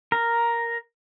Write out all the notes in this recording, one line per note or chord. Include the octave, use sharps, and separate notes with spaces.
A#4